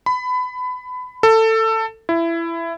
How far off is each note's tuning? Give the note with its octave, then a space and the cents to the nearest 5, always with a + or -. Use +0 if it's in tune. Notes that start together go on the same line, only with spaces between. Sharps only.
B5 +25
A4 +20
E4 +20